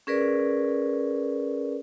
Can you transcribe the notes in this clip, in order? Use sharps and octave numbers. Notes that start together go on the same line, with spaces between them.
C#4 G#4 A#4 B4 D5